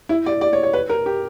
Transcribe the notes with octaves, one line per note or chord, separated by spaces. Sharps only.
E4
D5
D5
C#5
C#5
B4
A#4
G4